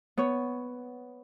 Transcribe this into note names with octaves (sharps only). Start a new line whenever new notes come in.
B3 C#5